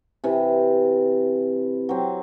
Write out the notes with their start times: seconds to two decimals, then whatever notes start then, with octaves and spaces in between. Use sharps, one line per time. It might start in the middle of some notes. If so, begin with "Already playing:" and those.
0.24 C3 E3
1.89 F#3 C4